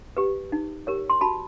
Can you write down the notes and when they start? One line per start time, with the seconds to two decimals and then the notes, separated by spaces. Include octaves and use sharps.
0.17 G4 B4
0.52 D#4
0.87 G4 A#4 C#5
1.10 C6
1.21 F#4 A5 B5